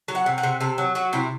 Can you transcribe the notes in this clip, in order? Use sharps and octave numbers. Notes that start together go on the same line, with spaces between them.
F#3
F#5
C3
F#5
C3
C3 A4
F#3
F#3 F#4
C3 E4